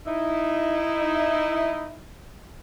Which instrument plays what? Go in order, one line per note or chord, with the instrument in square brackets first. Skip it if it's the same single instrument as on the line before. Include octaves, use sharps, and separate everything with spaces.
[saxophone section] D#4 E4